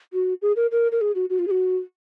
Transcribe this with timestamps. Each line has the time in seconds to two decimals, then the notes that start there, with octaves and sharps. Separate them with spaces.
0.13 F#4
0.42 G#4
0.56 A#4
0.72 A#4
0.92 A#4
1.01 G#4
1.15 F#4
1.30 F#4
1.39 F4
1.47 G#4
1.51 F#4